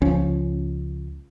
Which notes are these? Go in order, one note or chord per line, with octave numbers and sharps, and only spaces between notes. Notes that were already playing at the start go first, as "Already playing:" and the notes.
C#2 F3 C#4